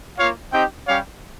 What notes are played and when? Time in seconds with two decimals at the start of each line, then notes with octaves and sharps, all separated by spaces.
0.18 A#3 F4 C#5 F5
0.52 C4 D#4 G4 D#5 G5
0.87 G3 C#4 G4 C#5 F5